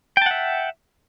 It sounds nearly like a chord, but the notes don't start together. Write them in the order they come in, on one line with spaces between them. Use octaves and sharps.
G5 A5 F#5 E5